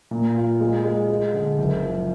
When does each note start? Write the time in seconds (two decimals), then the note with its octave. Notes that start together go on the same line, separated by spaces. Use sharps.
0.11 A#2
0.36 F4
0.61 G#3
0.85 G#3
1.10 G#3
1.34 D3
1.58 F#1
1.83 F3